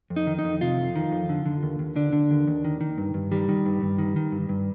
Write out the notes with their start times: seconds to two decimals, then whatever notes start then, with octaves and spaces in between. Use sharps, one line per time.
0.10 F2
0.16 D#4
0.27 D#3
0.39 D#4
0.44 F2
0.61 C3 F4
0.78 F2
0.96 D#3
1.12 F2
1.29 D3
1.46 D3
1.63 D#2
1.79 D#2
1.96 D3 D4
2.13 D3
2.30 D#2
2.47 D#2
2.64 D#3
2.81 D#3
2.98 G2
3.14 G2
3.31 D#3 G3
3.49 D#3
3.66 G2
3.82 G2
3.98 D#3
4.16 D#3
4.32 G2
4.49 G2